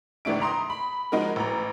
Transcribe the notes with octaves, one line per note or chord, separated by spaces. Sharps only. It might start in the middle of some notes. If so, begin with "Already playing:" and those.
G#1 C#2 E3 A3 D4 D7
A#5 C6 D#6
B5
F3 G#3 D#4 F#4 A#4
A1 A#5